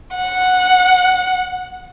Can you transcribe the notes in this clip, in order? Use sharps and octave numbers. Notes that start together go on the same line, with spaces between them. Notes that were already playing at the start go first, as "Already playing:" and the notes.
F#5